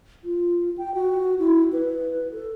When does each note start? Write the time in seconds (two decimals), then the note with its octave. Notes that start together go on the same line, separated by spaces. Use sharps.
0.24 F4
0.78 G5
0.94 F#4
1.39 E4
1.73 B4
2.32 A4